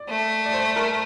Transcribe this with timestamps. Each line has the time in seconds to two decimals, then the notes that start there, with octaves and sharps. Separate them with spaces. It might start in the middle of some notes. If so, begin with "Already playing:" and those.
Already playing: D5
0.09 A3
0.46 D5
0.53 C5
0.76 A#4